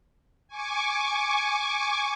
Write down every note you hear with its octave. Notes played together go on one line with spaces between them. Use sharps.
G#5 C#6 D6